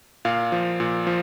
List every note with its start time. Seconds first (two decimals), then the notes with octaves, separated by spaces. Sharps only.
0.25 A#2 F5
0.52 F3
0.80 A#2
1.07 F3